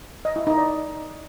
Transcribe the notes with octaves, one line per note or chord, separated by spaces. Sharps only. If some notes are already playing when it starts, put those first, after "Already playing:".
D#5
E4
D#4
D5